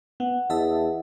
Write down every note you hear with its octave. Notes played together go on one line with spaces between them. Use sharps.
B3 F#5
E2 D#5 E5 A5